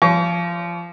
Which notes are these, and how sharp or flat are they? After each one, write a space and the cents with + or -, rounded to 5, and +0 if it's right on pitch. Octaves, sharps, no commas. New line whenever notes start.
F3 -20 C#5 +40 C#6 +45